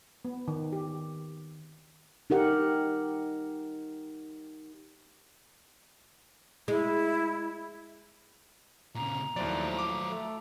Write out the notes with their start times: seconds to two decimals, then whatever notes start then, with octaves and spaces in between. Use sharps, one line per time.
0.25 B3
0.48 D#3
0.72 G4
2.30 D#4 G4 A#4 F#5
6.68 G#3 E4
8.95 A#2 C#3 A#5
9.36 D#2 A2 F3 F#3 A3 C5 D5
9.79 D6
10.07 A3